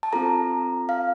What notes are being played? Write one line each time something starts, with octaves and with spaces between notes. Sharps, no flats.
A5
C4 F4 A4 A#5
F5